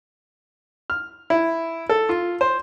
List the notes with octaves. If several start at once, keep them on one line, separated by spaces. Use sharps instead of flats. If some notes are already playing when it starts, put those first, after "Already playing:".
F6
E4
A4
F4
C5